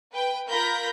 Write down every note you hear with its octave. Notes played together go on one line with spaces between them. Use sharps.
B4 G5
F4 A#4 B5 G6 A#6 B6